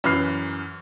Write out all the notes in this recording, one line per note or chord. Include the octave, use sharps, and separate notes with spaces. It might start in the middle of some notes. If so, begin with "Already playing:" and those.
F#2 E3 B5 F6 C7